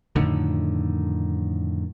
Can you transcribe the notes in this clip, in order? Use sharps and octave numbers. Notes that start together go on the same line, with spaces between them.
F2 A2 D3 D#3